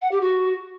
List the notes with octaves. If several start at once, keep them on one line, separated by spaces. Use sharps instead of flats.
F#5
G4
F#4